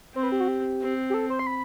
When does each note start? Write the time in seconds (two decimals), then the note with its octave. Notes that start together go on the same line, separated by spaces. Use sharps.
0.15 C4 C5
0.23 B4
0.32 G4
0.40 F#4
0.48 G4
0.81 C4
1.10 G4
1.14 A4
1.30 C5
1.39 C6
1.47 B5